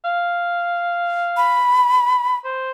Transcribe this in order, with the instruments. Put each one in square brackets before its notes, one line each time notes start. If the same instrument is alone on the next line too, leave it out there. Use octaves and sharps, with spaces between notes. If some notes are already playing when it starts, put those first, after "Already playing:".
[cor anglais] F5
[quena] B5
[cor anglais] C5